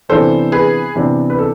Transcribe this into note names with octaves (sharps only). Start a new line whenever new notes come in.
C3 E3 B3 D4 A4 C5
G#4 B4
C3 E3 B3 D4
B4
A4